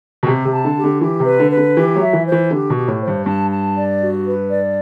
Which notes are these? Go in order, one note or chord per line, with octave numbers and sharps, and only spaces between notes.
B2
C3 G4
C3
A5
D3
G4
D3
E3 G4
C3
B4
D3
B4
D3
E3 G4
F#3
E5
E3
C5
E3
D3 G4
B2
G4
A2
C5
G2
G2 A5
A5
D5
F#4
B4
D5